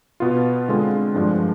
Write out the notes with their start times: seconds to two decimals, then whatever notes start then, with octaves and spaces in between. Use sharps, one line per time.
0.20 B2 B3 F4
0.68 D3 G#3 C4 F4
1.15 G2 F3 G#3 D4